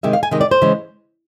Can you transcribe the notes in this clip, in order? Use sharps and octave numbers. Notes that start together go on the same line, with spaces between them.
C3 D#3 G#3 E5
F5
G#5
C3 D#3 G#3 D#5
D5
C5
C#3 E3 G#3